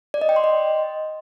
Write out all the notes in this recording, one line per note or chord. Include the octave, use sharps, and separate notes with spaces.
D5
D#5
G5
C6
D#5